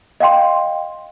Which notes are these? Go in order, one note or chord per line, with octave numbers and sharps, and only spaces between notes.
D#5 F5 G5 C6